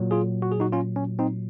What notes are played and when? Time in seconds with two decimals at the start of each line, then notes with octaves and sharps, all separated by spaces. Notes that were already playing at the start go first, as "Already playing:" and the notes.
Already playing: A#2 F#3
0.11 F4 G#4
0.42 F#4
0.52 G#4
0.60 D#4 F#4
0.73 C#4 F4
0.96 C#4
1.19 C4 D#4